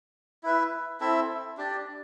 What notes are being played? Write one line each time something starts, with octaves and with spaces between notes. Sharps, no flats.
E4 B4 E5
C4 E4 A4 E5
D4 G4 D5